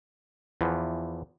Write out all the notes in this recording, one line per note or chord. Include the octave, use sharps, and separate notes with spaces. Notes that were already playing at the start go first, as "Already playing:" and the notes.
E2 E3 F3